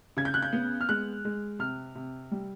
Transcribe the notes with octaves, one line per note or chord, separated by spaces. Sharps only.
C#3 G#6
G6
F#6
G6
B3
F6
G#3 F#6
G#3
C3 F6
C3
G3